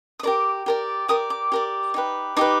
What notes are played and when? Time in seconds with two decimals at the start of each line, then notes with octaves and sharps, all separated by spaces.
0.20 D#6
0.23 G4 A#4 D5 D6
0.66 G4 A#4 D5
1.08 G4 A#4 D5 D#6
1.30 D6
1.52 G4 A#4 D5
1.94 D#4 G4 B4
2.37 D#4 G4 B4 D6